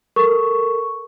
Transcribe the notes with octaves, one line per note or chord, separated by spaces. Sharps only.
A4 A#4 C#6